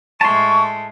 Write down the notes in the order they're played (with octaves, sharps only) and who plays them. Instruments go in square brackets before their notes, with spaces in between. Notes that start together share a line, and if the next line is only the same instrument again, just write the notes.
[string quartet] A2 G#3 A3 [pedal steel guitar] A5 C6 [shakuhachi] C#6